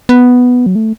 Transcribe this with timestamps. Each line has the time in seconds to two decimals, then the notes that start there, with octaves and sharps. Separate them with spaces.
0.09 B3
0.66 F#3
0.75 A3